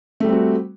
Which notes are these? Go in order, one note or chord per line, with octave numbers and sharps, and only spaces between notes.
G3 A3 C4 F#4